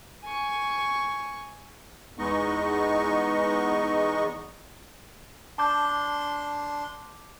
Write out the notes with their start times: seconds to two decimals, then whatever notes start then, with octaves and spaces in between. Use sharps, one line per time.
0.24 G#5 C#6
2.19 E2 G#3 B3 D#4 D#5 C#6
5.58 D4 A5 C6 D6 G6